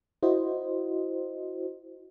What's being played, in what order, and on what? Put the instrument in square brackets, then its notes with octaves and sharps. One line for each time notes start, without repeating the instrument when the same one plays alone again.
[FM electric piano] E4 F#4 C5 D#5